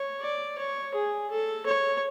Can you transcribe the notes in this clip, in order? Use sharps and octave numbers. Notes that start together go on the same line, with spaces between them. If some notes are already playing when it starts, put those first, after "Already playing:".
Already playing: C#5
D5
C#5
G#4
A4
C#5